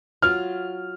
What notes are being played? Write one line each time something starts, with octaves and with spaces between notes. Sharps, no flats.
F#3 F4 F6